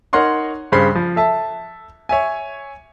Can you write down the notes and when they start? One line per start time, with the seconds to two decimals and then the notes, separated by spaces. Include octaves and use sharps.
0.13 D#4 A#4 C#5 F#5 C6 C#6
0.72 G2 C#3 C5 B5 C7
0.95 F3
1.16 A4 E5 A5
2.09 C#5 E5 G#5